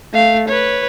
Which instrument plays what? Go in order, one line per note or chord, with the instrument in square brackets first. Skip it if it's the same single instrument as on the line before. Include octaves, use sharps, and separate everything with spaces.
[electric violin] A3 F5
B4 C#5